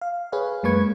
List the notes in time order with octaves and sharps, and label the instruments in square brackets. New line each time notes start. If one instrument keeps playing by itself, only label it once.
[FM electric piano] F5
G#4 B4 C#5 F5
F#2 G#3 A#3 B4 C#6 G#6